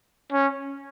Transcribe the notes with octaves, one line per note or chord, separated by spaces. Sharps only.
C#4